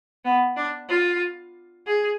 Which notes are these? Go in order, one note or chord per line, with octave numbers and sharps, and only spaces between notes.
B3
D4
F4
G#4